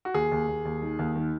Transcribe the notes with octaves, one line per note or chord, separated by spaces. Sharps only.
F#4
D#2 G#4
D#2
D#2
D#2
D#3
D#2
D#3